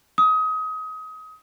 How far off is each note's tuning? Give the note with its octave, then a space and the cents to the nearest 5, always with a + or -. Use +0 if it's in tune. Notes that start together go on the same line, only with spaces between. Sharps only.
D#6 +25